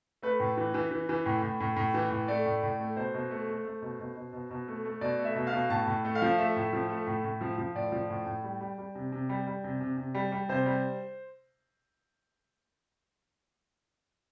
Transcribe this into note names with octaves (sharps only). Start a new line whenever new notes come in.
A3 B4
A2
E3
E3
E3
E3
A2
A2
A2
A2
E3
A2
A3 D5
A2
A2
A3
B2 C5
B2
A3
A3
A3
B2
B2
B2
B2
B2
A3
A3
B2 D5
A3
E5
B2
F5
B2
A2 A5
A2
A3
F5
F3
A3 E5
A2
F3
A3
A2
A2
F3
F3
A2 D5
F3
A2
A2
G3
G3
G3
C3
C3
G3
G3
C3
C3
C3
G3
G3
C3 C5
G3